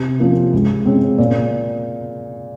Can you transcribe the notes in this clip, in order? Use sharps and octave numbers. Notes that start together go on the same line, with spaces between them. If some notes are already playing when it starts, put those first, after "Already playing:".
Already playing: C3
F3 A#3 C#4 F4
C#2
C#3 G#3 C4
A#2